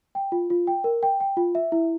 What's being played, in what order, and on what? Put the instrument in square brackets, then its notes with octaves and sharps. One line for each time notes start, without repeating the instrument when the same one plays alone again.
[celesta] G5
F4
F4
G5
A#4
G5
G5
F4
E5
E4